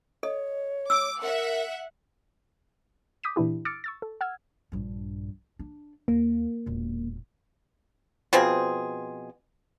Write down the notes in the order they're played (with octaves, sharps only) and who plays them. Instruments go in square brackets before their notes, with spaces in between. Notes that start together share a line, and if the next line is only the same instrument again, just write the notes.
[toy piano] A4 D#5 [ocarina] C#5
[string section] D6 [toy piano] E6
[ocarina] A#4 [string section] E5 F#5
[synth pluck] D6 D#6 G6 B6 D#7
A#2 E3 D4 E4 G4
D6 E6 F6 A6 C#7 D7
C#6 E6 A6
A4
F#5 E6 F6 G#6
[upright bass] A#1 G2
D4
[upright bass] D#2 [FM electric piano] A#3
[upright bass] E1 A#2
[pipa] B2 F3 C4 G#4